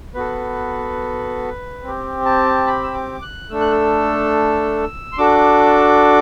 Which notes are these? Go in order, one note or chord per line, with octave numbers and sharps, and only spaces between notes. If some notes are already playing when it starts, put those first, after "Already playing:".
B3 F#4 A4 B4
C4 G4
A5
B5
E6
D6
F#6
A3 D4 A4 E6
F#6
E6
C6
D4 F#4 A4 D6